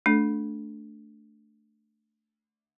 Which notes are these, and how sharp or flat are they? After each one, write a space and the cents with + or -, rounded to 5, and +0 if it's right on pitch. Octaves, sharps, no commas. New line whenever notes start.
A3 +0 D4 -10 A4 -20